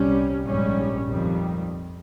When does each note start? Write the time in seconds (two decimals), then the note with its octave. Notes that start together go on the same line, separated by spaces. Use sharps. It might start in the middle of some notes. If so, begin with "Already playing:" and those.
Already playing: C2 A#2 G3 C#4
0.45 A#1 G#2 G3 C#4
1.09 F2 D#3 G3